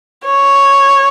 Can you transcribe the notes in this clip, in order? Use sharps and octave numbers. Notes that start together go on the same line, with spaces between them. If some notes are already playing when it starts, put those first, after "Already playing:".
C#5